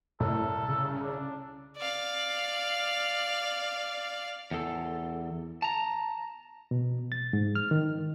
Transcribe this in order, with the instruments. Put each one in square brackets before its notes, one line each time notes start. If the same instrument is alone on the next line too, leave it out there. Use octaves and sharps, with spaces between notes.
[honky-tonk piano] C2 [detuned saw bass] A2 [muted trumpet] A4
[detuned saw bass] C#3
[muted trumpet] D4
[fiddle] D5 F5
[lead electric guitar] E2 A4
A5 A#5
[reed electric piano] B2
A6
G#2
F6
D#3